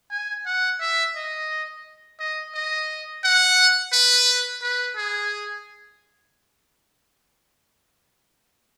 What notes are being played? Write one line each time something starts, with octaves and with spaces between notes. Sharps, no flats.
G#5
F#5
E5
D#5
D#5
D#5
F#5
B4
B4
G#4